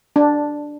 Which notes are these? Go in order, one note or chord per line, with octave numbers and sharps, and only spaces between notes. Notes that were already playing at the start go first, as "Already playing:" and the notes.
D4